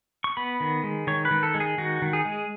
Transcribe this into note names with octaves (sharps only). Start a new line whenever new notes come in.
C#6
B3 B5
D#3
G#3
D#3 C#5
B4
D#3
A4
G#3
G#4
D#3 F#4
D#3
G#4
G#3